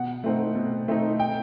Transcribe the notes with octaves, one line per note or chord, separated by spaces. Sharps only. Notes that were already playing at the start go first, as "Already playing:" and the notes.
Already playing: B2 F#5
A3 C4 D#4
B2
A3 C4 D#4
G5